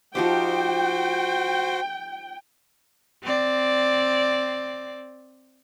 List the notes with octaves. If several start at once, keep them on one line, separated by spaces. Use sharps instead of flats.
F3 D#4 F#4 G4 C5 G5
C4 D5